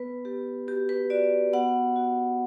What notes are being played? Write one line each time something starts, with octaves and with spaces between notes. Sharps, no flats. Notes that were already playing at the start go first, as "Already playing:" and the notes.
Already playing: B3 B4
B3 G4
F#4 G4
B4
F#4 D5
B3 F#5
F#4